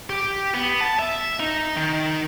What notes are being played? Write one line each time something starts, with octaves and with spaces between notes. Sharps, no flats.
G4
B3
A5
E5
D#4
D#3